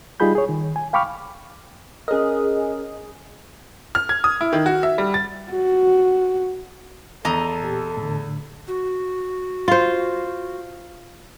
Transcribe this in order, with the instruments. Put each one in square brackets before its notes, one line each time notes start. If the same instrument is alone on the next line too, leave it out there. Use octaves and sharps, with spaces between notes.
[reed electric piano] G3 D#4 F4 G#4 B5 G6
G#4 C#5
D#3
G#5
F5 G5 B5 C#6 D6 F6
[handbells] C#4 A#4 [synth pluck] G#4 D#5
[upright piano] F6
G#6
D#6
E4
D#3
F#4
E5
G3
A6
[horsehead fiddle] F#4
[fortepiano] E2 [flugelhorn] A4 [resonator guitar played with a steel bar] D#5 A#5
[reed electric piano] A#2 G4
A2 D3
[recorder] F#4
[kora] F4 C5